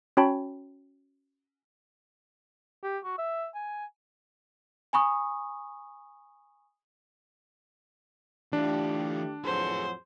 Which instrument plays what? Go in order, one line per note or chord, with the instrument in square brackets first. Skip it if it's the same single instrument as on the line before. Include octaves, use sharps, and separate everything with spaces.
[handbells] C#4 F#4 C#5 G5 A5 B5
[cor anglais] G4
F#4
E5
G#5
[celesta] G#5 B5 C#6 D#6
[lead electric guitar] E3 F4 [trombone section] A3 G4 [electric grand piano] D4
[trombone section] F2 A2 F#3 [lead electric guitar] G#4 B4 [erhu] C5